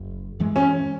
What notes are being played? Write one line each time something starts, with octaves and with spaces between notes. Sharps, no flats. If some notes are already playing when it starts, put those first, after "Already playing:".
Already playing: F#1
F#2 E3 G#3
C#4